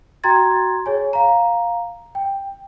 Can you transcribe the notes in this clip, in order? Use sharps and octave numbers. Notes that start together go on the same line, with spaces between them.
F#4 G5 A#5 C6 G#6 A6
G#4 C#5 G#5
F5 A#5
G5